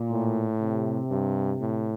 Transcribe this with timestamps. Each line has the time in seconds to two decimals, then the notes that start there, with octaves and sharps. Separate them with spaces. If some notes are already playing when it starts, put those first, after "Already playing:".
Already playing: A#2
0.11 A2
0.61 C3
1.10 G2
1.61 A2